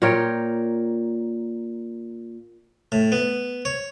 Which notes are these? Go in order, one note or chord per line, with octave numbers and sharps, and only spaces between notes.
A#2 A#4 C#5 G5
A2
B3
C#5